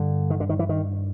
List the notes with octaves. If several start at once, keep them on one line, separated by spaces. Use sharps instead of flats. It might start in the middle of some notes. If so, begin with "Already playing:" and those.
Already playing: G2 D3
D#3
D3
D#3
E3
D#3